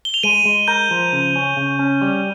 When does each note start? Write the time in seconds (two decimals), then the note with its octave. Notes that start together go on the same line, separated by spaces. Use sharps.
0.05 G7
0.14 F7
0.23 G#3 D#7
0.45 G#3
0.68 A#4 G6
0.91 F3
1.13 C#3
1.36 C#4
1.57 C#3
1.79 C#4
2.01 G3